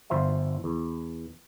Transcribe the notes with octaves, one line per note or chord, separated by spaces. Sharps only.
G1 F3 F4 C5 E5 A#5
E2